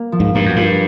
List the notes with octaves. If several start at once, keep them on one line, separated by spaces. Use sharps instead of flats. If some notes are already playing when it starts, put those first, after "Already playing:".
Already playing: A#3
F3
G#2
G2 A#3
F#2
G2 F4